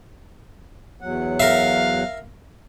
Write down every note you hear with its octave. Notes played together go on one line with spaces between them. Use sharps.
E2 F#3 F#5
A#4 E5 F5